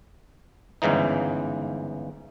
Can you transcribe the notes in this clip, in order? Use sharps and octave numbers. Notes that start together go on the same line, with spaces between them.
G1 G#2 C#3 E3 D#4